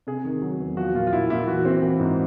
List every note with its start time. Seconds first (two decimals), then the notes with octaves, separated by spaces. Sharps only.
0.07 C3 G#4
0.25 D#3
0.42 F#3
0.59 E2
0.77 F3 F#4
0.95 A#2 F4
1.07 F4
1.13 A#2 E4
1.30 A#2 E4
1.48 E3 F#4
1.65 C4
1.82 E3
2.00 G#2